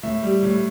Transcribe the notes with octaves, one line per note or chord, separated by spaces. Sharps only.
A2 E5
G3
A2